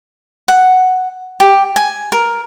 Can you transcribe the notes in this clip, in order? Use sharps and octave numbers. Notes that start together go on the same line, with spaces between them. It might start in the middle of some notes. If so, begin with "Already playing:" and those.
F#5
G4
G#5
A#4